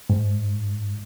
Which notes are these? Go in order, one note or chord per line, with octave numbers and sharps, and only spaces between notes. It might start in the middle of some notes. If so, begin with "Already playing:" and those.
G#2